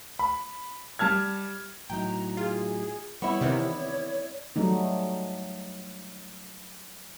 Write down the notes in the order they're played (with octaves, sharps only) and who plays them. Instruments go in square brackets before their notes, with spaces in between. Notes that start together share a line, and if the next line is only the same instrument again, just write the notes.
[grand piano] B5
G3 A5 F6 G#6
[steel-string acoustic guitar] A2 F#3 D#4 [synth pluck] G5 [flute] A#5
[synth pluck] F4 [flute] G#4
[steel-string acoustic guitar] G3 [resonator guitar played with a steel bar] B3 E4 [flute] C#5 [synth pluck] C#6
[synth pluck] C3 D#3 E3 [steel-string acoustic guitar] D5
[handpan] F#3 G3 A3 D#4